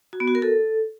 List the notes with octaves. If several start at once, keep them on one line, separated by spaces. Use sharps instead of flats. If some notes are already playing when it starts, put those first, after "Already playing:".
F#4
B3
F#4
A#4
A4